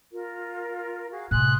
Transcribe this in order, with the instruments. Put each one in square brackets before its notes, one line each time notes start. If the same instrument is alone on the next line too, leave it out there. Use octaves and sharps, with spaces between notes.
[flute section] F4 A#4
F#4 G#4 F5
[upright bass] A2 C3 [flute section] G#5 C6 D#6 [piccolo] F#6